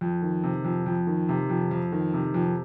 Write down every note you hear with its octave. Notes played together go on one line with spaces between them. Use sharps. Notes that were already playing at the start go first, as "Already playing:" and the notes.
F2
D#3
C3
F2
F2
D#3
C3
F2
F2
D#3
C3
F2